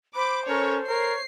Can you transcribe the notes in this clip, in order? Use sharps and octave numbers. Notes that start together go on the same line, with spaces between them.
C5 B5 D6
C#4 A4 A#4 C#5
A#4 C#5 C7